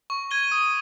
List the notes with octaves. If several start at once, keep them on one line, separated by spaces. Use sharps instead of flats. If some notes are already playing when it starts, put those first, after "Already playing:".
C#6
G#6 D#7 G7
D#6